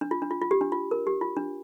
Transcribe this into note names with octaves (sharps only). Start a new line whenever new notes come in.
D4
F4
D4
F4
F4
G4
D4
F4
A#4
G4
F4
D4